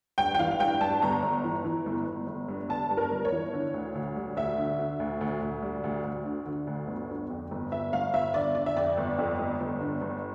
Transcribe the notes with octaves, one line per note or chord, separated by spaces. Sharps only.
G2 G5
G5
E3 F5
F5
G2 G5
G2 A5
G1 A#5
G1
E3
E3
G1
G1
G1
G2
G1 A5
G2
A#4
G1
C#5
E3
D3
D2
D2
G3
D2 E5
D3
D3
D2
D2
D2
G3
D2
D2
D3
D3
D2
G1
D3
F2
G1
G1 E5
G1 F5
G1 E5
D3 D5
D3 D5
E5
F2 D5
G1
F2
G1
G1
D3
G1